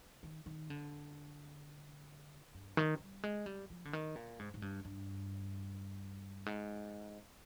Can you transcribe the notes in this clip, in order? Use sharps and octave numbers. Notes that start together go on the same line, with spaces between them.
D#3
D#3
D3
G2
D#3
G3
G#3
G3
F3
D3
D#3
A#2
G#2
G#2
G2
G2
G#2